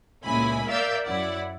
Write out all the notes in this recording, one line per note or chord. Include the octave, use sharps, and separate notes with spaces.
C#2 A#2 E4 G#5 B5
A#4 D5 E5 F5 E6 G6
F#2 E4 D5 F#5